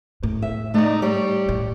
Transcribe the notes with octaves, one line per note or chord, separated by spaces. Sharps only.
A2
E5
A3 D#4 D5
G3 C#5
A2